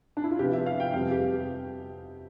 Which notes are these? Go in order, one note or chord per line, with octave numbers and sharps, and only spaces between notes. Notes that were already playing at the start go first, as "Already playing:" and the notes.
D4
E4
F4
C3 F3 B3 G4
E5
F5
G5
F2 C3 G3 B3 F5
G4